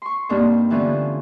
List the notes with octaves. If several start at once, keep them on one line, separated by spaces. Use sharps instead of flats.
C6 C#6
G2 A#3 C4 D4 D#4
D3 E3 F3 A3 B3 C#4